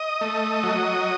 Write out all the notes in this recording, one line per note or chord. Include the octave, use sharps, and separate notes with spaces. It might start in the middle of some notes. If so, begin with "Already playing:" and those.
Already playing: D#5
A3
F#3